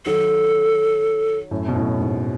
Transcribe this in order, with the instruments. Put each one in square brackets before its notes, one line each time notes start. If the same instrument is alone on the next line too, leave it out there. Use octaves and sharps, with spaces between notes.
[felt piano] D#3 F#3 [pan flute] A4
[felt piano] F#2 A2
B2
F#2 A2
G#2